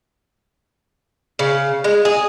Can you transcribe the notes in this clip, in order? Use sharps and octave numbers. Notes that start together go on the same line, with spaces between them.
C#3
G#3
G#4